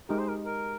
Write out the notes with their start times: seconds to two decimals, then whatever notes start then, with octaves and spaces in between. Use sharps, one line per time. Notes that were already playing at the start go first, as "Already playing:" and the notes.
0.09 G#3 D#4 G4 A#4
0.19 C5
0.29 A#4
0.46 A#4